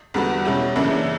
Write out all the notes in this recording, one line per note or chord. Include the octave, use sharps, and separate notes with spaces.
E2 D3 G3 B3 F#4
B2 G3 C#4 E4 G4
F#2 C#3 E3 A#3 D4